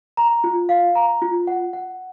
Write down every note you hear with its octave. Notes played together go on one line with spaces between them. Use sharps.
A#5
F4
F5
A#5
F4
F#5
F#5